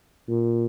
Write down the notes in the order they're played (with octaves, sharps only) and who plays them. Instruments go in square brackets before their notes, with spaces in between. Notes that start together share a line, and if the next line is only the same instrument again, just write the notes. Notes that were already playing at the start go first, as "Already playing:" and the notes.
[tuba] A#2